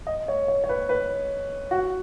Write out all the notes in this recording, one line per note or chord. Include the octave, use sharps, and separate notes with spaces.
D#5
C#5
C#5
C#5
B4
B4
F#4